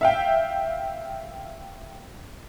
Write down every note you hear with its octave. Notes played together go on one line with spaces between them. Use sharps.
E5 F5 G5